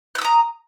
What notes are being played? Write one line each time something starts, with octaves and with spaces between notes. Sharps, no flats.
A#5 D#6 E6 F#6